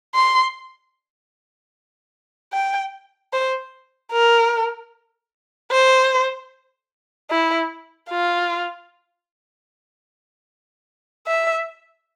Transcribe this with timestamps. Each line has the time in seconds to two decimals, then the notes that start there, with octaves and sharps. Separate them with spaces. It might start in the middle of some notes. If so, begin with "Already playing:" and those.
0.15 C6
2.53 G5
3.33 C5
4.12 A#4
5.71 C5
7.30 E4
8.10 F4
11.27 E5